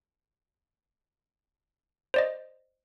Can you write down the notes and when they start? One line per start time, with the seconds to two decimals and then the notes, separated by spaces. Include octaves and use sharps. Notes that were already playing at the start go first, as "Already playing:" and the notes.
2.14 C5 D5 D#5